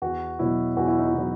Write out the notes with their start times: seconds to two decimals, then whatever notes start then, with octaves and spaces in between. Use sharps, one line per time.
0.02 E2 F#4
0.39 B2 F#3 E4
0.77 E2 F#4
0.88 E4
0.98 D#4
1.09 E4
1.14 B2 F#3